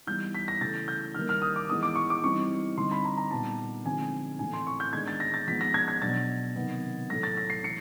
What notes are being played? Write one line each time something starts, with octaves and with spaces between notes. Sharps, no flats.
E3 G3 B3 D#4 G6
B6
A#6
C#3 E3 A3 C#4 A6
G6
D#3 G3 A#3 F6
F6
D#6
D6
E3 G#3 B3 D#4 D#6
D6
C#6
D6
E3 G3 C4 D#4 C#6
D3 G3 C4 D#4 C6
B5
A#5
A#5
A#2 G3 B3 D#4 A5
D3 F3 G#3 C4 D#4 G#5
A2 E3 A3 C4 G#5
C6
C#6
G6
D#3 G#3 B3 D4 G#6
A6
A#6
A6
F3 G#3 B3 D#4 B6
A#6
G#6
G#6
B2 F#3 B3 D4 A6
C3 D#3 F#3 B3 D#4
A2 F#3 A3 A#6
A6
A#6
C7
E3 A3 C#7